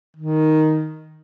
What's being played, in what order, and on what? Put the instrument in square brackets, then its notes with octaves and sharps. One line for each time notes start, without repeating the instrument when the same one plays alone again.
[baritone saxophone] D#3